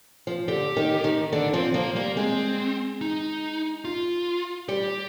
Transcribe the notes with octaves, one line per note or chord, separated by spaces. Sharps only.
F3
D3 G4
D#3
D#3
D3 D4
F3 C4
F3 A#3
G3 A#3
G#3 C4
D#4
F4
G3 G4